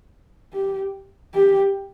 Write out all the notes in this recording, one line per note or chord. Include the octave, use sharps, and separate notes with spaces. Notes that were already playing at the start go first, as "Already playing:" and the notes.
G4
G4